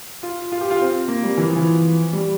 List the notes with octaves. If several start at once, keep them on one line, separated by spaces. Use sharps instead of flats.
F4
F4
G4
F4
C4
A#3
G3
E3
F3
E3
G3